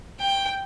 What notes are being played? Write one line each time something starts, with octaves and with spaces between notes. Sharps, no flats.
G5